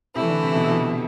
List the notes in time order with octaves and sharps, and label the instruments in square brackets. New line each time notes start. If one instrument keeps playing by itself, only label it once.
[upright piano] C3 [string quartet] E3 A3 E4
[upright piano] D3
C3
B2
B2